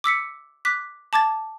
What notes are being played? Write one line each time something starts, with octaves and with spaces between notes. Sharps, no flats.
D6 E6 B6 C#7
D6 F#6 B6
A5 D6 G#6 A6